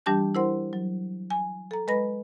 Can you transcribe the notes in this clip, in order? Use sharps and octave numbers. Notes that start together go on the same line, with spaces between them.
E3 G3 D4 G4 A5 G6
E4 A#4 C5 F#5 C6
F#3
G#5
A4 A#5
G#3 B4 D#5 B5 A#6